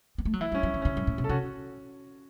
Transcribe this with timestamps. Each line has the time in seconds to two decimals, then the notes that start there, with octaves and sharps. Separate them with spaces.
0.18 B3
0.25 A3
0.33 F#3
0.41 E3 E4
0.52 F#3
0.54 C#4
0.63 F#3
0.74 E3
0.82 C#3 C#4
0.97 F#2
1.07 A2
1.18 B2
1.24 A4
1.29 C#3 C#4 F#4